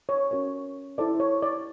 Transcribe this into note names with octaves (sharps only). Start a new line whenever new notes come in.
C#5
C#4 F#4 A#4 C#5
E4 A4 C5 D5
C#5
D5